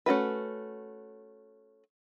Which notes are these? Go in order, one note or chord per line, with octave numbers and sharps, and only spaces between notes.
A3 C#4 F#4 B4